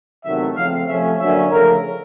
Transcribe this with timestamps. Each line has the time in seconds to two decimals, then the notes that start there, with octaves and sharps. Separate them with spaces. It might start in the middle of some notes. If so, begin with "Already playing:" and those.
0.25 E2 C3 D#3 F#3 A3 E5
0.56 C#3 F3 A3 C4 F5
0.88 C3 F3 A3 C#4 E5
1.20 D3 F#3 A#3 C#4 E5
1.51 C#3 F3 A3 A#4